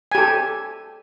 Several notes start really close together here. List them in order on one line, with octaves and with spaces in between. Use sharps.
G#5 G4 A4